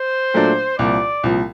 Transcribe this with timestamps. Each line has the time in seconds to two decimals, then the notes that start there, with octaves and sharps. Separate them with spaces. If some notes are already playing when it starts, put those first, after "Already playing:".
Already playing: C5
0.34 A#2 F#3 A3 D4
0.78 C2 A#2 F3 D5
1.24 C2 A#2 F3